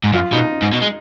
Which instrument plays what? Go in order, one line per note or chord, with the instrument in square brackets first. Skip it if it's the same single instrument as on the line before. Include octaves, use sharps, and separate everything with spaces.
[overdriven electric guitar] G#2
[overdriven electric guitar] F#2 [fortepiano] F4
[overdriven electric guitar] B2 [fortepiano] D#4
[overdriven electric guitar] G#2
B2
G#3